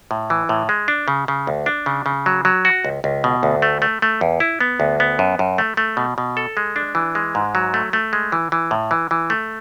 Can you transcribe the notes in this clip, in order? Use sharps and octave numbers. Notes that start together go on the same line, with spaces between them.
A2
E3
A2
G#3
D4
C#3
C#3
D2
D4
C#3
C#3
F#3
F#3
F#4
C#2
C#2
B2
D2
A3
A3
A3
E2
E4
B3
D2
B3
F#2
F#2
A3
A3
B2
B2
A4
G#3
D4
E3
G#3
G#2
F#3
A3
A3
G#3
E3
E3
A2
E3
E3
A3